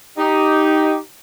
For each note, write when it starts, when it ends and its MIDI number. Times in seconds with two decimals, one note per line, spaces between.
0.18 0.96 63
0.18 0.96 67